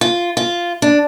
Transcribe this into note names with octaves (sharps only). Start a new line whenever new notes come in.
F4
F4
D4